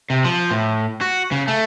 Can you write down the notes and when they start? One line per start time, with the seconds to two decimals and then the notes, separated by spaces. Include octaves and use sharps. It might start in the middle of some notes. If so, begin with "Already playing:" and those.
0.10 C3
0.25 F3
0.51 A2
1.01 F#4
1.32 C#3
1.48 A3